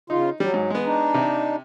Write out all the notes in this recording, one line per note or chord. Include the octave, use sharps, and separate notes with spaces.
C#3 D#4 F4
F#3 G3
G#2
G#3 B3
D4 D#4
C3